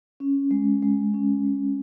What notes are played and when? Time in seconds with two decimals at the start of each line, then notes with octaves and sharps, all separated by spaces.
0.20 C#4
0.51 G#3
0.82 G#3
1.14 C#4
1.45 G#3